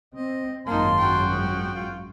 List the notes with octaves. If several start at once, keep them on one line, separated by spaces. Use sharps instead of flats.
C4 D#5
G#1 F#2 A#3 D#4 F4 A5 C6
F#4 G5
F3
F4